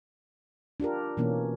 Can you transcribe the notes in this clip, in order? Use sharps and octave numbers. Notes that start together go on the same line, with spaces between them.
D4 F4 G4 A#4
B2 E3 A#3 C#4